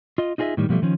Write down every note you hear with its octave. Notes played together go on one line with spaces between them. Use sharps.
F4 D#5
D#4 F4 G#4 A#4 D#5 E5
A2 D#3 G3
B2 F3 G3 A3
D#3 F3 C#4